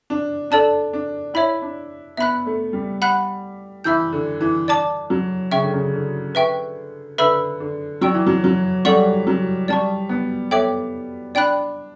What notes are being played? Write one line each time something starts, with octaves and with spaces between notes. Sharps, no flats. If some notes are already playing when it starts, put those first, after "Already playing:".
D4
D4 A4 D5 A5
D4
E4 C#5 E5 B5
D4
B3 E5 B5 F#6
A3
G3
F#5 B5 F#6
E3 E5 B5 E6 G6
D3
E3
D5 A5 D6
F#3
C#3 E5 G5 C#6
D3
C#3
D3
B4 E5 G5 C#6
D3 B4 E5 B5 E6
D3
F#3 D5 G5 C#6 E6
E3
F#3
F#3
G3 A4 D5 F#5 C#6
F#3
G3 D5 A5 C#6
B3
B3 A4 C#5 E5 G5 D6
D4 D5 G5 B5 F#6